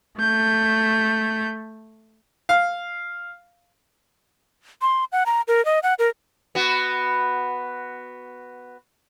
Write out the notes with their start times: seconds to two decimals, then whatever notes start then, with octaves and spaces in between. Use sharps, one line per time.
0.20 A3 G6
2.49 F5
4.82 C6
5.12 F#5
5.26 A#5
5.48 A#4
5.65 D#5
5.83 F#5
5.99 A#4
6.55 B3 F#4